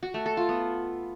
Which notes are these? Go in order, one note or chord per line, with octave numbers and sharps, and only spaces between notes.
F#4
A3
A4
F4
B3